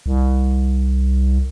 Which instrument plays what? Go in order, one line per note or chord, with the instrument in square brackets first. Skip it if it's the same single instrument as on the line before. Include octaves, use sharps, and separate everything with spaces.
[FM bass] C2